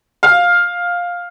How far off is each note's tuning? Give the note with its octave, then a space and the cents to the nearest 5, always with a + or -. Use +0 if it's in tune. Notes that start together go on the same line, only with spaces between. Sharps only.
F5 +10